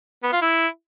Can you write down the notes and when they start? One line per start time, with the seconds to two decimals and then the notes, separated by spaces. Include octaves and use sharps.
0.23 B3
0.33 F4
0.42 E4